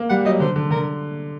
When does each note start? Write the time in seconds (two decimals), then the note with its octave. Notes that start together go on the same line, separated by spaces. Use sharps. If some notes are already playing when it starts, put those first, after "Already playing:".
Already playing: A#3
0.09 G3 F#5
0.25 F#3 D#5
0.40 D3 C5
0.56 D3
0.70 D3 A#4